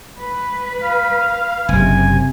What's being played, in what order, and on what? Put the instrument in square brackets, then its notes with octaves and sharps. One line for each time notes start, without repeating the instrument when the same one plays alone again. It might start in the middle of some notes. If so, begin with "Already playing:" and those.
[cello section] B4
[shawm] F5
[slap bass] F#1 [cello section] C3 [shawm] G#5